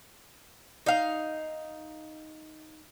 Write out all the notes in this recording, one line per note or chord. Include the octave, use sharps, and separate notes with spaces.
D#4 F5